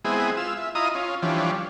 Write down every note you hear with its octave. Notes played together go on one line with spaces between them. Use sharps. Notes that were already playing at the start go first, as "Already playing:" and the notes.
G#3 B3 C4 E4 G#4
F4 E6
E5
E4 F4 D#5 A#5 D#6
C#4 F4
E3 F3 G3 C#4 D4